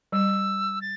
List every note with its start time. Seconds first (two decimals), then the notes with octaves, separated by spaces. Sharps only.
0.12 G3 E6
0.81 A6